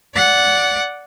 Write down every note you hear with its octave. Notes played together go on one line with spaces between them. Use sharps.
D5 F#5